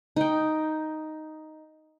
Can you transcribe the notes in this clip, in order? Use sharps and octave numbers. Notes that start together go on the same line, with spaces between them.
D#4 G5